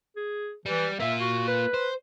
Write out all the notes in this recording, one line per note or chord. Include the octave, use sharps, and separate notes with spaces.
G#4
E3 G3
A#3 F4 E5
F#4
B4
C5